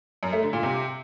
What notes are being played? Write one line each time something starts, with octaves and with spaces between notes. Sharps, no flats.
F#2
A3
D3
A#2
C3